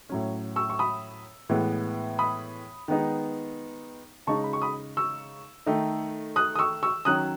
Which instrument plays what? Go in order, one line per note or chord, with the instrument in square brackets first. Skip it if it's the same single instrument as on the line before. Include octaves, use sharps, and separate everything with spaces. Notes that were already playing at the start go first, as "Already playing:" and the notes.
[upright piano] A2 F#3 C#4
C#6 E6
C#6
B5 D#6
A2 E3 G#3 B3
B5 D#6
D#3 G#3 B3 D#4
C#3 G#3 D#4 A5 C#6
B5
C#6
B5 D#6
C#6 E6
D#3 A3 D#4
D#6 F#6
D#6
C#6 E6
C#6 E6
D#3 F#3 C#4 D#6 F#6